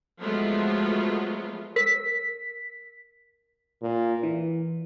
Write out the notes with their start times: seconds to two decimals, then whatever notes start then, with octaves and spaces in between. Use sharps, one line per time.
0.20 F3 F#3 G#3 A3 B3 F4
1.76 A#4 B6
3.82 A#2
4.23 E3